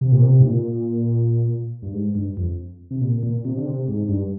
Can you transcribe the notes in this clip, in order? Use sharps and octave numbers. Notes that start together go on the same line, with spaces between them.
C3
A#2
C3
G#2
A#2
G2
G#2
G2
F2
C3
A#2
A#2
C3
D3
C3
G#2
G2